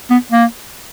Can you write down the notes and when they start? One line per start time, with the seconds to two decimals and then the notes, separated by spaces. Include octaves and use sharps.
0.11 B3
0.32 A#3